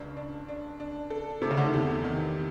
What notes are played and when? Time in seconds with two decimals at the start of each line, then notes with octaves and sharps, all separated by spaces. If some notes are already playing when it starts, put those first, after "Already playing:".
Already playing: C#2 C#3 D4
0.17 D4
0.48 D4
0.80 D4
1.10 A4
1.42 C3 A3
1.51 C#3
1.57 D3
1.65 D#3
1.73 E2 C3 E3
2.04 D#3